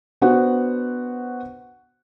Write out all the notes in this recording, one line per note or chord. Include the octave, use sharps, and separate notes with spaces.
B3 D4 F#4 C5 F#5